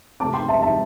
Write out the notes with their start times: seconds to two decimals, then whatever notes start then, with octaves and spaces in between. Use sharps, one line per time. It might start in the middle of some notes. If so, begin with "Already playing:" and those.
0.20 C3 A3 C4 A5 D6
0.34 G5 C6
0.48 E5 A5
0.62 E5 A5